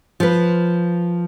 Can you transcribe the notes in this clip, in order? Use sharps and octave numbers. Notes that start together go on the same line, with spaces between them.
F3 B4